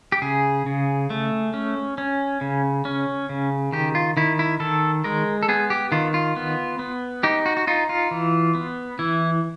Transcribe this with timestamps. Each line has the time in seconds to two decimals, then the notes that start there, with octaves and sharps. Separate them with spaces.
0.12 G4
0.22 C#3 G#4
0.66 C#3
1.10 A3
1.54 C#4
1.98 C#4
2.41 C#3
2.85 C#4
3.29 C#3
3.72 D#3 G4
3.95 F4
4.17 D#3 E4
4.39 E4
4.60 D#3 A4
5.04 G#3 A#4
5.43 A4
5.49 B3 G#4
5.70 G4
5.92 D#3 F4
6.14 F4
6.36 B3
6.79 B3
7.23 D#4 G4
7.46 F#4
7.57 F#4
7.67 D#4 F4
7.89 F4
8.11 E3
8.55 B3
8.99 E3 E4